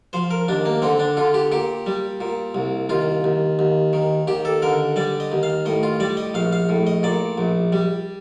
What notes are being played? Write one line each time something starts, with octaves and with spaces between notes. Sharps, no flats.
F3 C5
A#4
D#2 D4
A#3
D3 C4
D4
D3 F4
G4
A#2 G4
G3
A#2
C2
D#2 F4
D#2
D#2
D#3
D#2 G4
A4
D3 A#4
G3 D5
D#5
D#2
F5
A2 D#5
F4
G3 D5
D#5
A#1 F5
F5
A2
D#5
A#2 D5
A#1
G3